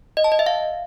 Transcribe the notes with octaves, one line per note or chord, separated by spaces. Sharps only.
D#5
A5
D#5
E5
F5